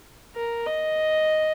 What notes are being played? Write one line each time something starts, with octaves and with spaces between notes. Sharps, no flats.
A#4
D#5